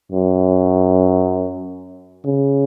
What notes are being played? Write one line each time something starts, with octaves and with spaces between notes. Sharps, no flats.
F#2
C#3